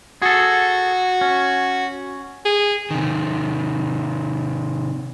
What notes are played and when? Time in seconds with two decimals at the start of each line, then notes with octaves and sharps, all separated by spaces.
0.22 F#4 G#4 A4
1.21 C#4
2.45 G#4
2.91 C3 D#3